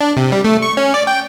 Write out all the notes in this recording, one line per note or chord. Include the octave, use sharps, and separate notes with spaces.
D4
C3
G3
A3
C#6
C#4
D5
G5